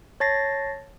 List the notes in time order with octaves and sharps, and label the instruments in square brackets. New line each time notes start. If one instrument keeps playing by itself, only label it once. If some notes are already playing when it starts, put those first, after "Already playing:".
[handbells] C#5 A5 A6 A#6 C7